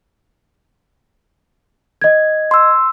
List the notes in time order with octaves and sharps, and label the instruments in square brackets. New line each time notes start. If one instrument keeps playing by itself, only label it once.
[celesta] D#5 G#6
[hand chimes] C6 E6